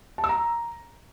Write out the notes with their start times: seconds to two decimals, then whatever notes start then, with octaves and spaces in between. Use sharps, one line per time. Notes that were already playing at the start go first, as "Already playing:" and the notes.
0.18 A5
0.24 E6
0.29 A#5